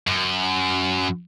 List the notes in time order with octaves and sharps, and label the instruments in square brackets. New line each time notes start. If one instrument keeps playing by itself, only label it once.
[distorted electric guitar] F#2